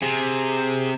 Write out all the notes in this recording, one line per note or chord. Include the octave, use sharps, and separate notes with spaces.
C3 G#4